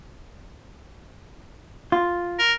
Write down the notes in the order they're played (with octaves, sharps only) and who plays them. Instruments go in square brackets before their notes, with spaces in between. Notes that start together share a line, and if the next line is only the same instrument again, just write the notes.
[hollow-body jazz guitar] F4
[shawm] A#4